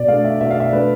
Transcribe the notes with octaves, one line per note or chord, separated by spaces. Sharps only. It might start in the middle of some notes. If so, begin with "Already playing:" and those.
Already playing: B2 D5
A3 D4 F5
E5
B2 E5
F5
E5
A3 D4 B4